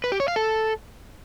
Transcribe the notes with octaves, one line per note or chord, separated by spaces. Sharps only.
B4
G4
C#5
F5
A4